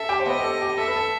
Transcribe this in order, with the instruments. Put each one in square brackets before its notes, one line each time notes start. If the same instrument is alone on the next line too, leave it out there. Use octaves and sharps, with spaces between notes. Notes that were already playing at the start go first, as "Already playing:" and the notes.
Already playing: [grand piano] A4 A5 [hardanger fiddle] E5
[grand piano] G4 G5
C5
[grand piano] B3 B4 [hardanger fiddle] D#5
[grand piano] G4
A4
G4
[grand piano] A4 [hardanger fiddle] E5
[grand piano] B4
A4